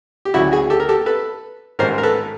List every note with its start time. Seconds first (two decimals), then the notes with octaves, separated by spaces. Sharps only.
0.25 G4
0.34 D2 C#3 F#3 E4 F#4
0.52 F#4 G#4
0.70 G4 A4
0.80 A#4
0.89 G4 A4
1.06 A4 B4
1.79 A1 G#2 D#3 A#4 C5
1.98 A#4
2.03 A4 B4